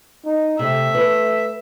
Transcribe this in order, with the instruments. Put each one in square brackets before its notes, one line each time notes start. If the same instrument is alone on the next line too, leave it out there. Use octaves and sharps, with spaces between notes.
[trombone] D#4
[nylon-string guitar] C3 [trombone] A3 [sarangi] E5
[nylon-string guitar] B4